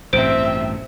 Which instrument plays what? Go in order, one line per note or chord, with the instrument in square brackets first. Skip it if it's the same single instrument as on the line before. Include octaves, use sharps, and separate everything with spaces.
[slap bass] A1 G2 B2 [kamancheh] C4 E5 [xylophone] C5 D7